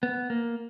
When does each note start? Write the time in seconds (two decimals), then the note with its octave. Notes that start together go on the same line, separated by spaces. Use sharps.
0.03 B3
0.30 A#3